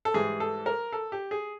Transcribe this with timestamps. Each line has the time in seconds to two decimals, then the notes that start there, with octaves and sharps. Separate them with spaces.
0.05 A4
0.14 G#2 E3 G3 G#4
0.40 A4
0.66 A#4
0.93 A4
1.12 G4
1.31 G#4